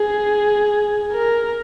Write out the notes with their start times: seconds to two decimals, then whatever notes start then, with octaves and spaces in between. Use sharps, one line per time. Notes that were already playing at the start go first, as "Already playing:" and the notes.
Already playing: G#4
1.12 A#4